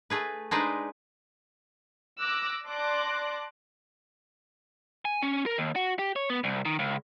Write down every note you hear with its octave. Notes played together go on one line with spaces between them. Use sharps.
A3 G#4 B4
G#3 D4 D#4 G#4 B4 C5
D6 E6 F#6 A#6
D5 A5 C6 D6 F#6 A#6
G#5
C#4
A#4
D#2
F#4
G4
C#5
B3
C2
D#3
C#2